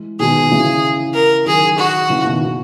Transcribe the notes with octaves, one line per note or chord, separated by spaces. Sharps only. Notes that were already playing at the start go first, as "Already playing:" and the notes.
Already playing: E3 G#3
B2 D#3 G#4
C#3 E3
A#4
D#3 F#3 G#4
F#4
C#3 E3
B2 D#3
B2